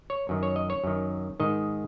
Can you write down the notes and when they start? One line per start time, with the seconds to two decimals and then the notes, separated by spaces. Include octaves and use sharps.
0.10 C#5
0.29 F#2 D#3
0.43 C#5
0.56 D#5
0.70 C#5
0.84 F#2 D#3
1.40 G#2 D#3 D#5